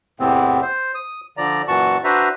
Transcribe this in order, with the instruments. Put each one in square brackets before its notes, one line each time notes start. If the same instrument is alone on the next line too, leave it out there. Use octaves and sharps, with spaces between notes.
[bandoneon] E2 A2 C3 E3 B3 C4
C5
D#6
D3 F3 D5 A#5
F#2 A#2 E3 F#4 A5 C#6
D4 F#4 B4 C5 E5 A#5